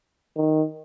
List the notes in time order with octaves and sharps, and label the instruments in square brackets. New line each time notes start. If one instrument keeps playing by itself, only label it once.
[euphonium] D#3